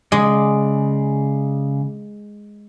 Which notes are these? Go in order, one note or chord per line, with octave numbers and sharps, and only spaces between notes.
C#3 G#3 D5